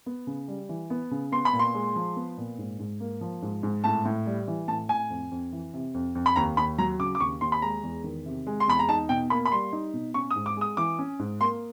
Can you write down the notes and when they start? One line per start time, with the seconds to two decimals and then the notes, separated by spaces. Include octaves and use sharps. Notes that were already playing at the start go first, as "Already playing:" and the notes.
0.06 B3
0.27 C#3
0.48 G3
0.69 E3
0.90 B3
1.11 C#3
1.32 B3 C6
1.45 B5
1.53 A#2
1.59 C6
1.75 G#3
1.96 F3
2.16 B3
2.38 A#2
2.58 G#2
2.79 G#2
3.00 A#3
3.21 F3
3.42 G#2
3.63 G#2
3.84 A2 A5
4.05 A2
4.26 G3
4.48 E3
4.68 A2 A5
4.89 A2 G#5
5.10 F2
5.31 F2
5.52 E3
5.73 C3
5.94 F2
6.15 F2
6.26 B5
6.36 D#2 A#5
6.57 D#2 B5
6.78 F#3 A#5
6.99 C#3 D6
7.15 D6
7.20 D#2 C#6
7.41 D#2 C6
7.52 B5
7.62 G#3 A#5
7.83 E2
8.04 D#3
8.26 C3
8.47 G#3
8.60 C6
8.68 E2 B5
8.79 A#5
8.89 D#4 A5
9.09 B2 G5
9.30 A#3 B5
9.45 B5
9.52 G3 C6
9.73 D#4
9.93 B2
10.14 C#4 C#6
10.31 D#6
10.36 G#2
10.46 D6
10.57 G#3 D#6
10.77 E3 D6
10.99 C#4
11.19 G#2
11.41 A#3 C6